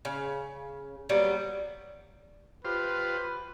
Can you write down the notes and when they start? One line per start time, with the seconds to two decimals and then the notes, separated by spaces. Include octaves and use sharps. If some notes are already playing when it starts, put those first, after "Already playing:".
0.05 C#3
1.09 F#3 G3 A#3 B3
2.65 F4 G4 B4 C5